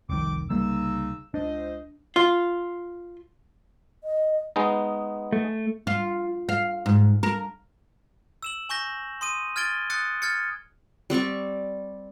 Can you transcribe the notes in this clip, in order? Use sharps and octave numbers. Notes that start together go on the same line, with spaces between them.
F1 C2 D#3 C4 D6
C2 C#3 G3 A#3 D#4 E6
C#2 D4 C5 D#5
F4
D#5
G#3 B3 D#4
A3
F4
F5
G#2
A#4
E6 E7 F#7
G#5 C#6 G6 A#6
C6 D#6 D#7
F6 G#6 A6 D7 G7
D#6 F#6 A6 C#7
F6 G#6 A6 C#7
G3 C4 D5 C#6